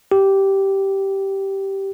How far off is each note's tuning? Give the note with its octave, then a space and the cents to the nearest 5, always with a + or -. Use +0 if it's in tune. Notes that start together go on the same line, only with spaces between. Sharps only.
G4 -10